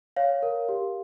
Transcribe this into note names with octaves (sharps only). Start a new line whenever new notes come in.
C#5 F5
A#4
G4